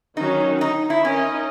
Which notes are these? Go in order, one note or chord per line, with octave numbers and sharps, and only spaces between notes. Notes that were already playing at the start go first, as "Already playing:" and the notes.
D#3 F#3 C#4 D#4 F#4
D#4
E4
C#4 D#4 A#4 D#5